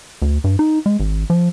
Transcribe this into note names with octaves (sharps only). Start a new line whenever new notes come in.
D2
G2
D#4
G#3
G#1
F3